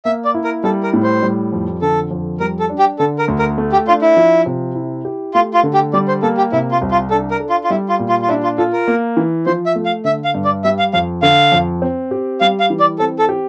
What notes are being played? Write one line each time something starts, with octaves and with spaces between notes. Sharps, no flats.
A#3 E5
D5
E4
A#4
G3 A4
A#4
A2
C5
G3
F2
D3 A4
F2
G3 A#4
A4
D4
G4
D3 A4
A#4
D2
A#4
A3
G4
D4 F4
E4
F3
C3
E4
G4
A3 F4
F4
D3
G4
G3 D5
C5
A#3 A4
G4
C3 E4
F4
C2
F4
D4 A4
A#4
A4
F4
F4
G3 E4
F4
A#2
F4
F4
D4 E4
F4
F4 A4
A#4
A#3
E3
F3 C5
E5
A3
F5
D3 E5
F5
G2
D5
G3 E5
F5
F2 F5
D3 F5
F2
C4
G4
G3 F5
F5
E3
D5
C4 A4
A4
G4